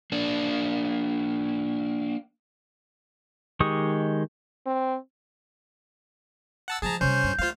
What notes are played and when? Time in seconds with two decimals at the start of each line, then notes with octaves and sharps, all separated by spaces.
0.12 A#3 D4
3.60 D#3 G#3 G4 C#6 D#6
4.66 C4
6.68 F#5 A5 E6
6.82 F3 G#3 G#4 A5 A#5
7.01 C3 G3 C#4 C5 G6
7.24 G2
7.39 A3 F4 C5 F5